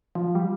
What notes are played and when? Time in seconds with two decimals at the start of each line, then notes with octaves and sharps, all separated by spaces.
0.15 F3
0.35 G3